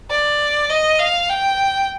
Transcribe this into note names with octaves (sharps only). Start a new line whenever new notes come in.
D5
D#5
F5
G5